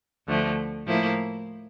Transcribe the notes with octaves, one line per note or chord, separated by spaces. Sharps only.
D2 D3 F3 A3
A2 F3 A#3 E4